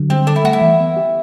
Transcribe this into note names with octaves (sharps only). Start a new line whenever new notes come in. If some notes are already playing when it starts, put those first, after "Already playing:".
Already playing: D3 F#3
G3 C4
D4 A4
E4
A3 F#4
E4
E3
B3
G4